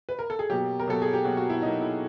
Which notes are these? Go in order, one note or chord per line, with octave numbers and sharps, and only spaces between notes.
B4
A#4
A4
G#4
B2 F#3 A#3 G4
A#4
B2 F#3 A#3 A4
G#4
G4
B2 F#3 A#3 F#4
F#4
E4
B2 F#3 A#3 D#4
E4